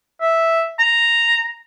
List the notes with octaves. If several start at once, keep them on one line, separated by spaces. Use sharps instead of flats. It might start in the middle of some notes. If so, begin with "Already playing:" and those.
E5
A#5